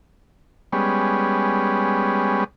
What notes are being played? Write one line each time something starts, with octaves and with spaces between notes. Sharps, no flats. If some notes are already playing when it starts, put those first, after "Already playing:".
G3 G#3 B3 C#4